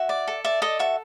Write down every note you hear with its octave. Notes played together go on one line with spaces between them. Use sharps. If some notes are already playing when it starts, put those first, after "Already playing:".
Already playing: F#4 E5
D5
A4
D5 E5
A4 D#5
F#4 E5